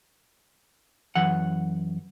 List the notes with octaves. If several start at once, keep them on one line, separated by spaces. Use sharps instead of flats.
F#2 E3 F#5